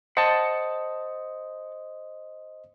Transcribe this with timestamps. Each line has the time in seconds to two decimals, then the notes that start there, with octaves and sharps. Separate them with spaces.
0.17 C5 D#5 F#5 A5